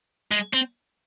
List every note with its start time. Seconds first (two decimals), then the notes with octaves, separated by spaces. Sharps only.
0.31 G#3
0.53 C4